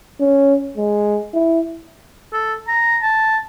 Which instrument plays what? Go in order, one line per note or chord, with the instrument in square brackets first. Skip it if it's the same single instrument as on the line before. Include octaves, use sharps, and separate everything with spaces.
[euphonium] C#4
G#3
E4
[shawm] A4
A#5
A5